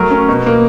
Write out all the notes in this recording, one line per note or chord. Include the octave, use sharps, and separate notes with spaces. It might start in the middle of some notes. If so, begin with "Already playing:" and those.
Already playing: F#3 A3 A#4
C#4
B2
A#3